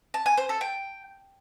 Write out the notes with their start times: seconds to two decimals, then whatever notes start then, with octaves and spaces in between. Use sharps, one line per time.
0.14 A5
0.26 G#5
0.37 C5
0.49 A4
0.61 G5